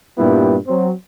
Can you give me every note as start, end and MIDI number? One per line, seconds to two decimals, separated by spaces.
0.17 0.57 43
0.17 0.57 46
0.17 0.57 55
0.17 0.57 59
0.17 0.57 64
0.67 0.90 54
0.67 0.90 60